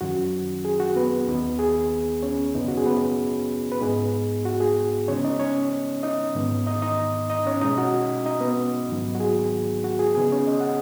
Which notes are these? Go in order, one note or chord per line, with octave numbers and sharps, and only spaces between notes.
F#2 D#3 F#3 C#4 F#4
G#4
F#4
B3 B4
D#2 D#3 B3 D#4
G#4
C#4 C#5
F#2 C#3 B3 D#4
F#4
G#4
B3 B4
B4
G#2 G#3 B3 D#4 G#4
F#4
G#4
C#3 G#3 B3 C#4 D#4 C#5
D#4 D#5
C#4 C#5
D#4 D#5
G#2 D#3 B3
D#4 D#5
D#4 D#5
D#4 D#5
C#4 C#5
B2 G#3 C#4 D#4 D#5
F#4 F#5
D#4 D#5
B3 B4
G#2 D#3 F#3 D#4
F#4
G#4
F#4
G#4
C#3 B3 D#4 G#4
C#4 C#5
D#5
F#5